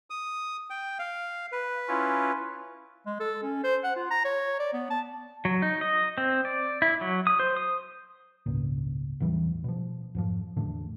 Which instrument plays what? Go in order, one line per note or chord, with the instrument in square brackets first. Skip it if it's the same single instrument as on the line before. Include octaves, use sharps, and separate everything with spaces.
[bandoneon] D#6
G5
F5
B4
[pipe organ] C#4 E4 F4
[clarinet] G#3
A4
C#4
C5
F#5
F4
A#5
C#5
D5
B3
A5
[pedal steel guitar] F#3
D#4
D#5
C4
D5
E4
F#3
D#6
C5
D#6
[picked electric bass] G#1 C#2 A#2
A1 E2 E3 G3
B2 F3
F2 G#2 F3
A1 E2 A2 D3